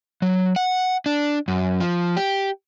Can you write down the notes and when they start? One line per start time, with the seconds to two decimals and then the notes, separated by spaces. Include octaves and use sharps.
0.22 F#3
0.56 F#5
1.06 D4
1.48 F#2
1.80 F3
2.17 G4